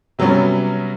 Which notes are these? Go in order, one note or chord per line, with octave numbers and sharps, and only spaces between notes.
C3 F#3 G3 B3 C#4